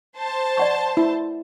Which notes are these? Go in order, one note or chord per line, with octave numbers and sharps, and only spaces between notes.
C5 A5
D5 F#5 C#6
E4